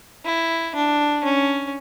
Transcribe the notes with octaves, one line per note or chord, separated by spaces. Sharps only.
E4
D4
C#4